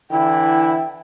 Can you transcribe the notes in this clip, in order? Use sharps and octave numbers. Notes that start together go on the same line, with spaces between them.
D3 E3 E4 G5